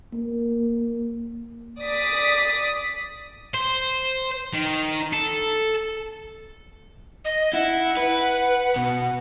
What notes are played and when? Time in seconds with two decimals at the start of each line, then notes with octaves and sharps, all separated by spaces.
0.13 A#3
1.80 D5 D#6 B6
3.54 C5
4.54 D#3
5.13 A4
7.25 D#5
7.53 E4 F#5
7.97 B4
8.76 B2